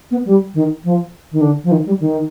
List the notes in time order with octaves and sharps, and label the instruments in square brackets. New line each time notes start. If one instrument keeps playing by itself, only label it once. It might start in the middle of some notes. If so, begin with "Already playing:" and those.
[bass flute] B3
G3
D#3
F3
D#3
D3
F3
D#3
G3
D#3